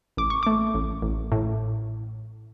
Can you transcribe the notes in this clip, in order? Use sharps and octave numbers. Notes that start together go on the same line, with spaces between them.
A1 D6
C#6
A3 D6
A1
A1
A2